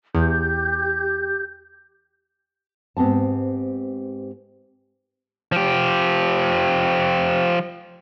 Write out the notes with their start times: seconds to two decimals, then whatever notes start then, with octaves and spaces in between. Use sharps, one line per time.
0.15 E2 G4 G6
2.97 G#2 B3 C4 G4 A5
5.52 F3 G4